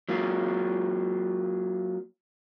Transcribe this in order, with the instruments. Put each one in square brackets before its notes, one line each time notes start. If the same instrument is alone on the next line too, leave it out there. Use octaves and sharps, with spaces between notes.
[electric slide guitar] F#3 A#3 F4